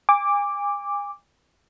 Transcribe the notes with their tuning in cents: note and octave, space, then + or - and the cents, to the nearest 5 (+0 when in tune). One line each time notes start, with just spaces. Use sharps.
G#5 -35 D6 +0